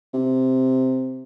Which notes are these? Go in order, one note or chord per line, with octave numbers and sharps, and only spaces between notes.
C3